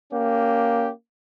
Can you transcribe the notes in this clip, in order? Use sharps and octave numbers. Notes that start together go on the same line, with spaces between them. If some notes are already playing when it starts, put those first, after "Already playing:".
A#3 C#4 G4